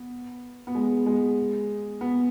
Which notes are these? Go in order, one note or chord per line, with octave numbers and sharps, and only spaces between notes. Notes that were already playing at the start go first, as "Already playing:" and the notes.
Already playing: B3
B3
G#3
G#3
B3